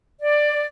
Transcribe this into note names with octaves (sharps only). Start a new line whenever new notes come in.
D5